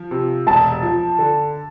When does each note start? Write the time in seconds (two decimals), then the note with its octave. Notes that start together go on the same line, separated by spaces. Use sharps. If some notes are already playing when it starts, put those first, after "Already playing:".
Already playing: F3
0.11 C3
0.47 E1 A5
0.83 F3
1.19 D3